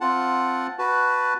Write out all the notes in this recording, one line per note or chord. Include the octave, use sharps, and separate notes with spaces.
C4 F4 F#5 A5
F#4 B4 A5